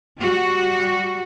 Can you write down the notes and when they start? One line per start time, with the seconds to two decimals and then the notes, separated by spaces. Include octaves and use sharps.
0.19 G3 F#4